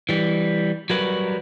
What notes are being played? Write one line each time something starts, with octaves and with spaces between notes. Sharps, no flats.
E3 G3
F#3 G3 F#4 A#4 B4